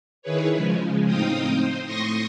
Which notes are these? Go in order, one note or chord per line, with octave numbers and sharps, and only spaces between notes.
D#3 E4 G#4 B4 C#5
C#3 F3 G#3
A2 C4 D#4 F5 G5 D#6
C5
A2 C6 C#6 D#6 A#6